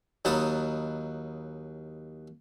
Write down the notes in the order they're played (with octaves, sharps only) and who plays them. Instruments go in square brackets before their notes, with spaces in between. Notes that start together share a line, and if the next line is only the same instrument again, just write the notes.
[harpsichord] D#2 F#3 D#4 B4 A5 D#6